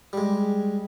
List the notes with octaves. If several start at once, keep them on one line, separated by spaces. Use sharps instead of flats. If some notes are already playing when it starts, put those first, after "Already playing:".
G3 G#3